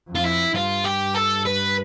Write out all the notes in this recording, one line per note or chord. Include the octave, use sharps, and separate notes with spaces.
F2
F4
E4
G2 F4
G4
A4
B4